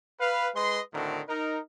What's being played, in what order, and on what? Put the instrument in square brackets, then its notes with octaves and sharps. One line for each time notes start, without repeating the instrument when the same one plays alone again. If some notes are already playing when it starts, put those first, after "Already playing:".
[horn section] B4 F5
G#3 B4 D#5 C6
A2 D3 D#3 C4 F#4 A#4
D#4 A#4